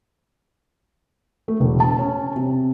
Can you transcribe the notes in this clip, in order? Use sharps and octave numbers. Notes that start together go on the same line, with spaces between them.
A3
E1
A5
C#4
C3